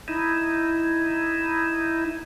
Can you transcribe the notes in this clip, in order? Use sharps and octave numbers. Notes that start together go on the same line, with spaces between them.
D#4 E4